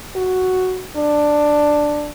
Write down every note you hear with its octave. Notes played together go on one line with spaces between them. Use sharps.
F#4
D4